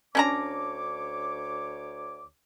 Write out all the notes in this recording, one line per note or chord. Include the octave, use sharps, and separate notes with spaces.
D2 C#4 D4 C#5 A#5 D6